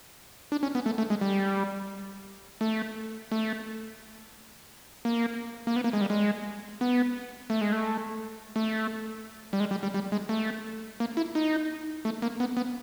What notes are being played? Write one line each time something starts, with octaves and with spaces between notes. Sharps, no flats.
D4
C#4
B3
A3
A3
G#3
G3
A3
A3
A#3
A#3
B3
A#3
G#3
G3
G#3
B3
A3
G#3
A3
A3
G3
G#3
G3
G3
G3
G#3
A3
A#3
E4
D#4
A3
A#3
B3
B3